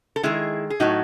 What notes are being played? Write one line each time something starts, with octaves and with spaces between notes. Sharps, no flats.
A4
D#3 G#3 E4 G#4
G#4
A2 F#3 A3 D#4 F#4